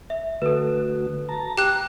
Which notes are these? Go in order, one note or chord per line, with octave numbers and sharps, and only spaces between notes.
E5
D3 A3 F#4 A4 B4
A5 A#5
G4 G5 A#5 F#6